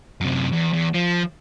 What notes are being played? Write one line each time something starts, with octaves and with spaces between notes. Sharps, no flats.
F#2 C3
E2
E2
F3